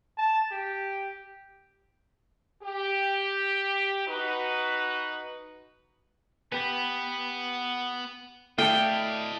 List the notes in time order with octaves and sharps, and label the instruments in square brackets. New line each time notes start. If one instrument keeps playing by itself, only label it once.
[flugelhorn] A5
G4
[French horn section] G4
D#4 F#4 B4
[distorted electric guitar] B3 [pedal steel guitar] G4 B4
[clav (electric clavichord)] A3 A4 [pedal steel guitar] E4 D5 F5 [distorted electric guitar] D#5 A5 [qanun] G5